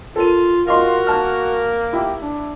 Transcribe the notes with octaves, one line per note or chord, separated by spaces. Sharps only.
F4 A4 A#4 D#7
F4 F#4 A#4 D#5 F5 C6
A#3 A5 F6
E4 G4
D4